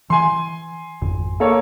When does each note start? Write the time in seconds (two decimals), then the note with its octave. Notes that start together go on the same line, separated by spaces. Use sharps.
0.10 E3 G#5 C6
1.02 G#1 F2
1.40 A#3 A4 C#5